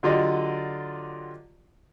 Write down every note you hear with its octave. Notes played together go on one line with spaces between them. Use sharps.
D3 F#3 F4 G4 D5 D#5